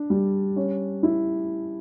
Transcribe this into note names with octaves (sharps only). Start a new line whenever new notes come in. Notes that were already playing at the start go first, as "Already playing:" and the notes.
Already playing: D4
G3
C#4
E4